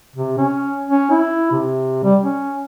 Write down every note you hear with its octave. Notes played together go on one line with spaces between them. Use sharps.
C3
C#4
C#4
E4
C3
G3
C#4